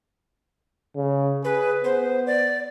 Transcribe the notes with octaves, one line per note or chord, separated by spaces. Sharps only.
C#3
G#4 B4
B3 C5
D5